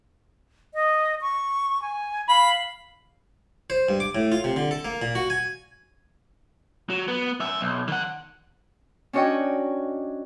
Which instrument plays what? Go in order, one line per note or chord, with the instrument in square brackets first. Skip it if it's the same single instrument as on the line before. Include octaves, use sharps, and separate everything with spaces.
[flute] D#5
C#6
G#5
[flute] F5 [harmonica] B5
[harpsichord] C5
G2
D6
A2
F4
C3
D3
A4
A#3
A#2
F#4
G#5
[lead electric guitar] F#3
B3
F#2 E5
B1
D#3 F#5
[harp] C#4 D4 F#4 C#5 D#5 G5